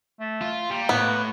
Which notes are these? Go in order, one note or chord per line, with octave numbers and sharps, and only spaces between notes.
A3
F4
G3 A#3
A2 B3